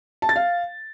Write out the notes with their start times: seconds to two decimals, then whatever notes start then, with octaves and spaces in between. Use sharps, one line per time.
0.22 A5
0.29 A6
0.36 F5